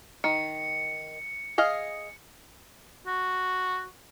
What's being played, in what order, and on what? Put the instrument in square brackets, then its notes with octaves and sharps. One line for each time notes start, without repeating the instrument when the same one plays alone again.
[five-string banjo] D#3 [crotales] C#7
[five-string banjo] G#4 D#5 F5
[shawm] F#4